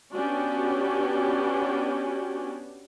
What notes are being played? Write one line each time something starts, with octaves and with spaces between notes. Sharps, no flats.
B3 C#4 D4 F#4 G4